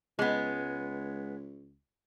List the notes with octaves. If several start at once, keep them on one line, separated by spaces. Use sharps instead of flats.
C#2 G#3 B3